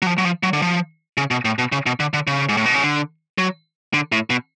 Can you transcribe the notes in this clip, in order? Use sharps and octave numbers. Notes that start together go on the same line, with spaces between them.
F#3
F3
F#3
F3
F#3
D3
F3
C#3
B2
A2
B2
C#3
B2
D3
D3
C#3
G#2
A2
B2
C#3
D3
F#3
D3
A2
B2